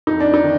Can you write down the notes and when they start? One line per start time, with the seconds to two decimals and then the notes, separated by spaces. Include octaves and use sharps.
0.07 F2 D#4
0.20 D4
0.34 D#4
0.43 D#3